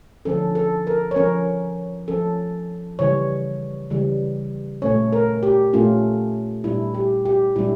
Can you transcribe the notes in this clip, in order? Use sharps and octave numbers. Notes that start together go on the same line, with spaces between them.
D3 F3 C#4 A4
A4
A#4
C#5
F3 C#4 A#4
F3 C#4 A4
C#3 E3 G3 C#5
C#3 E3 G3
A#2 A3 C#4 C#5
A#4
G4
A#2 A3 C#4 F4
A#2 G3 D4 E4
G4
G4
A#2 G3 D4 E4